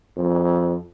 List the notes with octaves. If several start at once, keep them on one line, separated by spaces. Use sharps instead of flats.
F2